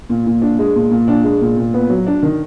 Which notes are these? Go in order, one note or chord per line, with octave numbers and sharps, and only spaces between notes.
A#2
A#2
D4
G#3
A#2
A#2
D4
G#3
A#2
A#2
B3
F#3
D4
D#3